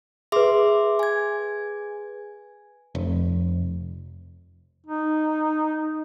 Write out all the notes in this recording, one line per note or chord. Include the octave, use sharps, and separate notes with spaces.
G#4 B4 E5 C6 D6
G#5 G#6
F1
D#4